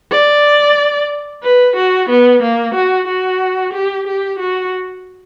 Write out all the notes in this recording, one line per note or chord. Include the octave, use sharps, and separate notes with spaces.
D5
B4
F#4
B3
A#3
F#4
F#4
G4
G4
F#4